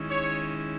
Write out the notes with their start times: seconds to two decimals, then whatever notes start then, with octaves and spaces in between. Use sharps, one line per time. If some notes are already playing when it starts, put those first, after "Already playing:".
Already playing: D#3 G#3 C#4 E4
0.11 C#5